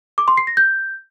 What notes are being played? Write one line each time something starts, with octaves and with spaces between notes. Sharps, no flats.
D6
C6
C7
A#6
G6